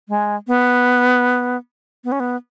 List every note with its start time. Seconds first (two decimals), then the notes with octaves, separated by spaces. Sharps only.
0.09 G#3
0.47 B3
2.04 B3
2.12 C#4
2.20 B3